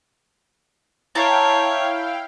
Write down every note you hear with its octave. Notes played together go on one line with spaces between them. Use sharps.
E4 C#5 F5 G5 A5 A#5